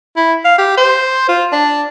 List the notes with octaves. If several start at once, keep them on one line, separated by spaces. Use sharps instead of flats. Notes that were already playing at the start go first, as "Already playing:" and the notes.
E4
F5
G4
C5
F4
D4